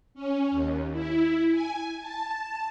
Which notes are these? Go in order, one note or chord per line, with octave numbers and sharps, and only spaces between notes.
C#4
D#2
E4
G#5
A5